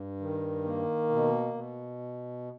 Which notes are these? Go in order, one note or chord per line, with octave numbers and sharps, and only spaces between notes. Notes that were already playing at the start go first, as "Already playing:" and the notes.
Already playing: G2
D#3
A#3
B2
B2